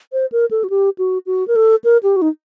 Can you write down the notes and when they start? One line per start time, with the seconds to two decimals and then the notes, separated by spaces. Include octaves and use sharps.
0.13 C5
0.32 A#4
0.51 A4
0.64 F#4
0.70 G4
0.98 F#4
1.26 F#4
1.48 A#4
1.56 A4
1.84 A#4
2.03 G4
2.16 F#4
2.22 D#4